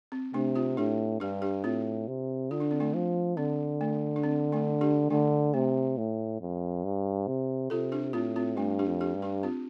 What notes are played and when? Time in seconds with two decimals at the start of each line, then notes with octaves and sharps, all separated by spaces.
0.12 C4
0.34 C3 A3 D4
0.55 C4 F4
0.77 A2 D4 G4
1.20 G2 D4 G4
1.42 D4 G4
1.64 A2 C4 F4
2.07 C3
2.51 D3 F4
2.60 D4
2.71 C4
2.80 A3 D4
2.94 F3
3.37 D3 C4
3.81 A3
4.16 D4
4.24 C4
4.53 A3 D4
4.81 D4 G4
5.10 D3 A3 D4
5.54 C3 A3
5.97 A2
6.41 F2
6.84 G2
7.27 C3
7.70 C3 F4 A4
7.92 D4 G4
8.13 A2 C4 F4
8.36 C4 F4
8.57 G2 A3 D4
8.79 D4 G4
8.86 F2
9.01 D4 G4
9.15 G2
9.22 D4 G4
9.43 C4 F4